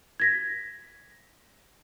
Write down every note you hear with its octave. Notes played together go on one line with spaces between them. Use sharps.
G#6 A#6 B6